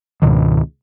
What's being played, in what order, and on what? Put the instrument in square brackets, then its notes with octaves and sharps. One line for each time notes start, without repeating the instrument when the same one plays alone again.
[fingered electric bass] C#2 G#2 B2 D#3